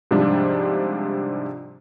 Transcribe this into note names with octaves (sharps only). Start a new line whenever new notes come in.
G#2 C3 F3 G3 D4